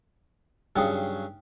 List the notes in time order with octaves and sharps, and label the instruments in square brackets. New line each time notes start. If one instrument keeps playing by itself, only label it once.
[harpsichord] G2 C#3 F#3 [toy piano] D#4 G5 D#6